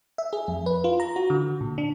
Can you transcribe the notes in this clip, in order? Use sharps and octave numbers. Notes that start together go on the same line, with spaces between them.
E5
G#4
F2
B4
F4
A#5
F#4
D3
A#2
D4